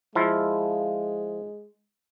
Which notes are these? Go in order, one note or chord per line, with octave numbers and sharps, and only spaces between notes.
F3 G#3 E4 F4